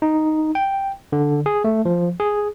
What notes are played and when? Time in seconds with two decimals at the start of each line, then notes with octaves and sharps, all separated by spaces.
0.02 D#4
0.55 G5
1.12 D3
1.46 G#4
1.64 A3
1.85 F3
2.20 G#4